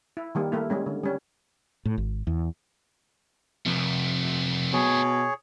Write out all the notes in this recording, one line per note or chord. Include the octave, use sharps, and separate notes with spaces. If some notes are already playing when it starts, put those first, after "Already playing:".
E4
D#3 G3 A#3
A3 A#3 E4
G3 G#3 C#4
D3
G3 C#4
A2
G#1
E2
F2 C3 A3 C4
B2 G#4 C#5